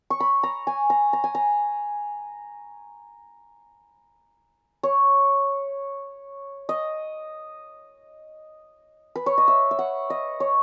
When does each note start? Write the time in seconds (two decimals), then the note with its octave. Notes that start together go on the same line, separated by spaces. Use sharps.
0.10 C#6
0.20 B5
0.43 A#5
0.67 G#5
0.90 A#5
1.13 A#5
1.24 G#5
1.35 A#5
4.83 C#5
6.69 D#5
9.16 B4
9.26 C#5
9.38 D#5
9.48 E5
9.71 E5
9.79 F#5
10.10 D#5
10.40 C#5